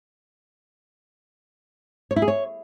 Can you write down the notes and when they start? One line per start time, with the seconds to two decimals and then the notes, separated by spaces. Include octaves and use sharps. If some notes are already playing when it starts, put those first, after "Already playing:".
2.11 C#5
2.16 E4
2.22 G#4
2.28 C#5